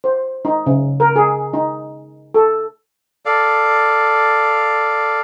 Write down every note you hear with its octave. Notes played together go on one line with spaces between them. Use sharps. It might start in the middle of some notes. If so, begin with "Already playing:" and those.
C5
D#4
C#3
A#4
G#4
D#4
A4
A4 D5 F5